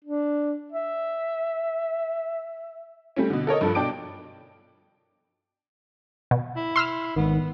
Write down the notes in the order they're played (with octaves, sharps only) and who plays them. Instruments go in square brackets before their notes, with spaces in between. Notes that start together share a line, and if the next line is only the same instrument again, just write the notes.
[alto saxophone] D4
E5
[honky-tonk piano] G3 A3 C4 C#4
B2 D3
A4 A#4 C#5 D#5
G2 F3 A4
B2 D4 G5 A5 D6 D7
[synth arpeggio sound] B2
[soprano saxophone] E4
[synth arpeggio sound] C6 E6 F6
[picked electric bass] G#1 D#3 [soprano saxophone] B3